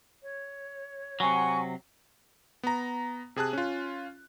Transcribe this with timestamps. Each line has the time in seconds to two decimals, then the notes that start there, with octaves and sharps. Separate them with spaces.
0.22 C#5
1.20 C3 F#3 F#5 G#5 C#6
2.63 B3 A#5
3.36 C3 G#4 A5 F#6
3.53 C#4 F4